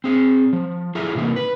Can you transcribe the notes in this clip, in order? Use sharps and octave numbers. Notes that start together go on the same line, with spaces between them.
C4 G#4
F3
E4 F4 G#4 A4 E5 A#5
A2 C3 E3 A#3 D#4
B4